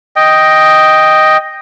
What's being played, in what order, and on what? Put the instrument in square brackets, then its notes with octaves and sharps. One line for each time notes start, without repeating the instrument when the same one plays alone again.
[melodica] D#5 G5